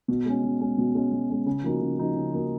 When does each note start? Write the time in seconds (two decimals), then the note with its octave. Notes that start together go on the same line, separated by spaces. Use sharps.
0.08 B2
0.26 G#3 C#4
0.44 B2
0.61 G#3 C#4
0.78 B2
0.95 G#3 C#4
1.12 B2
1.30 G#3 C#4
1.46 C#3
1.63 F3 A#3 D#4 F#4
1.81 C#3
1.98 F3 A#3 D#4 F#4
2.16 C#3
2.33 F3 A#3 D#4 F#4